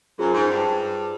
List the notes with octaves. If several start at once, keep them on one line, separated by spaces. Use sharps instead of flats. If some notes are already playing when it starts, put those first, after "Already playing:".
F#2 F4 G#4 C5
G#2
G2